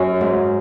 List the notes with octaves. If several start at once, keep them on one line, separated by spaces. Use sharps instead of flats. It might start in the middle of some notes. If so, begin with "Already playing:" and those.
Already playing: F#2
G#2